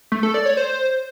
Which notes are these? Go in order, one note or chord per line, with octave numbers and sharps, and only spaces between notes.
A3
A4
D5
C#5
C5